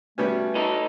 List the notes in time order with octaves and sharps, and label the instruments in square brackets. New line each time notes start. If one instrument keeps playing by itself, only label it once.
[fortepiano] G3 B3 C#4 [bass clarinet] A3 [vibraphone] F#4 B4
[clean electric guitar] D#4 A4